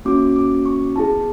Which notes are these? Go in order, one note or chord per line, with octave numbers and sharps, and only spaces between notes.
A#3 C#4 F#4 D6
D6
C#6
B3 E4 G#4 A5